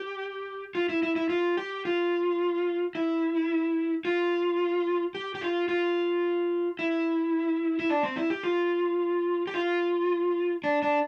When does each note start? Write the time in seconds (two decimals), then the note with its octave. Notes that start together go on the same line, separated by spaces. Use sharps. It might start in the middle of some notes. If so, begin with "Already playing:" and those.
Already playing: G4
0.75 F4
0.89 E4
1.03 E4
1.16 E4
1.30 F4
1.57 G4
1.85 F4
2.95 E4
4.05 F4
5.15 G4
5.35 G4
5.41 F4
5.69 F4
6.79 E4
7.80 E4
7.90 D4
8.03 C4
8.16 E4
8.30 G4
8.44 F4
9.47 G4
9.54 F4
10.64 D4
10.82 D4